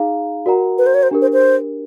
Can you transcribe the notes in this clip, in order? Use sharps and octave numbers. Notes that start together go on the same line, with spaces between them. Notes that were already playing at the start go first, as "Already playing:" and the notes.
Already playing: D#4 G#4 F5 A#5
F#4 A#4 D5 F#5 A#5
B4
C5
C#5
C5
D4 G4 A#4
C5
C5